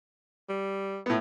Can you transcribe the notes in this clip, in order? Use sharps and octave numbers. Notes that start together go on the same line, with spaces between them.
G3
A2 B3